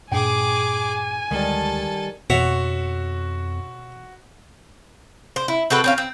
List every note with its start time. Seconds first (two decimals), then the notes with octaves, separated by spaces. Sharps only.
0.12 G2 A#2 D4 G#4 G5 G#5 D6
1.31 D2 D#3 G3 G#3 A4 A5
2.30 F2 B2 F#4 C#5 E5 F#5
5.36 C5
5.48 E4
5.70 C4 F#4 A4 B4
5.84 C4 C#4 F5
5.98 C4